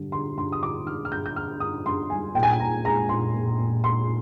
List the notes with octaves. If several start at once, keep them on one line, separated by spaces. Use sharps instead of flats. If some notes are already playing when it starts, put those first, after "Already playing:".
Already playing: G2 D3 G3
D3 C6
G2 C6
D#6
D3 D6
D3 F6
F6
G2 G6
G6
D3 F6
G2 D#6
G2 C6
G3 G#5
A#2 G5
G#5
G5
A#2 A#5
G#3 A#5
A#2 C6
A#2
A#2
G#3 C6